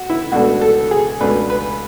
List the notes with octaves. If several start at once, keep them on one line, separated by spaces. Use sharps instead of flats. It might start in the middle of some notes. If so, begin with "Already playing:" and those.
Already playing: F#4
E4
C#2 B2 A3 D4 F#4
A4
G#4
C#2 B2 A3 D4 B4
B4